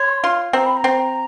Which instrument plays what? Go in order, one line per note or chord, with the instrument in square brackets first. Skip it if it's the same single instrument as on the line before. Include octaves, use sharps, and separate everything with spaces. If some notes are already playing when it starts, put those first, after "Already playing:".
Already playing: [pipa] C#5 [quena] C6
[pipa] F4
[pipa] C4 [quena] A#5
[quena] B5
A#5
[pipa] C4